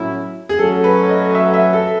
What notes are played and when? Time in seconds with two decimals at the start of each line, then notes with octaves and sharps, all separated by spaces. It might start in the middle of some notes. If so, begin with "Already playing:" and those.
Already playing: A2 F#3 C#4 E4
0.49 G#4
0.59 F#3 A3 C#4 A4
0.84 B4
1.09 D#5
1.35 E5
1.54 E5
1.73 A4